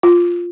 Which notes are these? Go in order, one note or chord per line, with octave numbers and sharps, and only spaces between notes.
F4